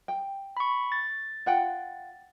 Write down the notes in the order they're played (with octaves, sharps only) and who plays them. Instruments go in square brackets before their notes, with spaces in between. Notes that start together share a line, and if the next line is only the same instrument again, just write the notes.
[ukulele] G5
[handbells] B5 C#6
A6
[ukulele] F4 F#5 G5